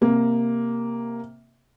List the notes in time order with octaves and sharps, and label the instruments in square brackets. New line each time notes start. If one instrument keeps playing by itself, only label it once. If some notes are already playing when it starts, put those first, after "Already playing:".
[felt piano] C3 A#3